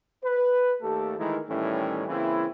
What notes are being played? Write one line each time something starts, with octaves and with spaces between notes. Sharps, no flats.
B4
D#2 A3 G4 A4
D#3 E3 G#3 A3 E4 A#4
A2 D#3 E3 G3 C#4
C#3 E3 A#3 C4 E4